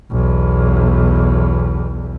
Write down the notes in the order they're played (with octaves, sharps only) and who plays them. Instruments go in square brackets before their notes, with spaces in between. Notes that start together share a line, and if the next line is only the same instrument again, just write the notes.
[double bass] B1 E2